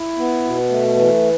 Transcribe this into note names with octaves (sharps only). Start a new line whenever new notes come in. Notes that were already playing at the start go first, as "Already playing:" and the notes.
Already playing: E4
B3
B2
A3
E3